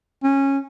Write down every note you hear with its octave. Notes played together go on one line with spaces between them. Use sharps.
C#4